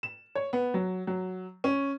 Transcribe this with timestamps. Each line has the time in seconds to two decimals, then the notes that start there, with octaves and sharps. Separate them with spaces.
0.03 E7
0.35 C#5
0.53 B3
0.74 F#3
1.07 F#3
1.64 C#4